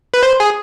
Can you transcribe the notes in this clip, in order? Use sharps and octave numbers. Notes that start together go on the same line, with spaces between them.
B4
C5
G#4